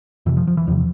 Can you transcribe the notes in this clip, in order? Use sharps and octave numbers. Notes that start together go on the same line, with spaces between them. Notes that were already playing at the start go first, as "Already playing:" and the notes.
F2 C3 E3
F3
F3
E3
E2 C3 F3